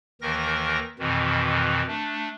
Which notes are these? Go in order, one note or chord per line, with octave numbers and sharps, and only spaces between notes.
D#2 D#3 E3 A#4 A#6
F2 B2 D#3 E3
A3 D4